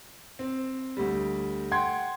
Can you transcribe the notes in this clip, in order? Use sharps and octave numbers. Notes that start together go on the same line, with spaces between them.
C4
D2 G3
F#5 G5 C6 G#6